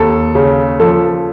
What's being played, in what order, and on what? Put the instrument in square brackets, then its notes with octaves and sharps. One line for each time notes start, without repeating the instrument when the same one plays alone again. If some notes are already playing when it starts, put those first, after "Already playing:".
Already playing: [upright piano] D#2 A4
C#3
F3 A4